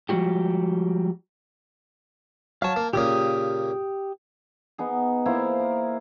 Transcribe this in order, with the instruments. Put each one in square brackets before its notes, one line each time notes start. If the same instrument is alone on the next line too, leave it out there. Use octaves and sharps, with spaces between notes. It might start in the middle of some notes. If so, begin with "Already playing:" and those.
[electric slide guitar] F3 G3 G#3 F#4 G4
[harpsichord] F#3 C#5 [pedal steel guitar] F5 A5
[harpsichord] A#3
[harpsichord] A#2 C#3 A#3 [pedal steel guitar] G4 D#6
[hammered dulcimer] B3 D#4 G#4
A#3 E4 C5 A#5
A#4